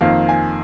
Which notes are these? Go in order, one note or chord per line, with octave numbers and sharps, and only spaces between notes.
F2 D#3 A#3 F5
G#5